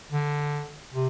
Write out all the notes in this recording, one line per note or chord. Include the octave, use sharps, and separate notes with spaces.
D3
C3